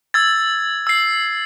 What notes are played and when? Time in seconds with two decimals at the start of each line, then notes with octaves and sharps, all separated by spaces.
0.14 E6 G#6 A6
0.87 E6 C7